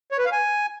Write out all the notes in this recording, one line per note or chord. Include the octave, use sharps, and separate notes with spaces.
C#5
B4
F5
G#5